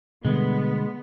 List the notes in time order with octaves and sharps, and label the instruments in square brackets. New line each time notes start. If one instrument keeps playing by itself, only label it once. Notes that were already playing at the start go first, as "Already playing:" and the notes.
[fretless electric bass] B2 D3 G3 [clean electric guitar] G#3 [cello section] B3